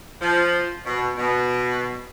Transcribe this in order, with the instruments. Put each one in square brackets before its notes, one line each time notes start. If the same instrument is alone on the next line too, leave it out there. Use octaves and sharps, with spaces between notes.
[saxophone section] F3
B2
B2